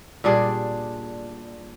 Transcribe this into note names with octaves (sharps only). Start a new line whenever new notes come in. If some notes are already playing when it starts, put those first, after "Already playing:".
A#2 G3 D4 G#4